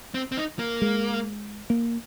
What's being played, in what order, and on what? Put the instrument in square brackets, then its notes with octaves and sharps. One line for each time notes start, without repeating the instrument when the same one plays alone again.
[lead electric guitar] C4
C4
D#4
A#3
[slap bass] G#3
A#3